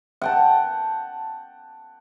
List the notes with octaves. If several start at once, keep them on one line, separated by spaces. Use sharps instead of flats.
F#5 G5 A5